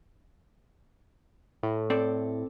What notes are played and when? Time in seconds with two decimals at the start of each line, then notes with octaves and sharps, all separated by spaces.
1.63 A2
1.90 C4 A4 D5